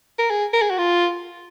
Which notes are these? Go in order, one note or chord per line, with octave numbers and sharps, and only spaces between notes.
A#4
G#4
A#4
G#4
F#4
F4